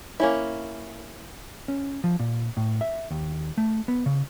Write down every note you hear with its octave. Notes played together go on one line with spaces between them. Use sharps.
A#3 C#4 E4
C#4
F3
A#2
A2
E5
D#2
A3
B3
C#3